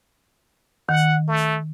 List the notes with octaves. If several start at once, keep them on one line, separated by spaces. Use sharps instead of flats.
D#3 F#5
A3